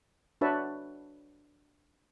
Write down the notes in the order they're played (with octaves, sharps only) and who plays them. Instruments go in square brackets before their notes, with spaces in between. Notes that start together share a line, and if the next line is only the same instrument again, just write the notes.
[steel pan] D4 F#4 B4 C#5 E5 A5